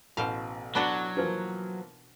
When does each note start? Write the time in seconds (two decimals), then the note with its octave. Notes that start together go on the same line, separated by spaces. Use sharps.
0.17 A1 B2 C5 F5
0.75 F#3 B3 D4 F#4
1.17 E3 F3 A#3